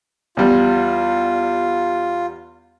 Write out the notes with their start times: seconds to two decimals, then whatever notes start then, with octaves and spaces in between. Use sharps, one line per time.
0.37 E2 G3 F4